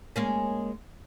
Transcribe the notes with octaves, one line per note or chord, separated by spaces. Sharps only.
G#3 A#3 C#4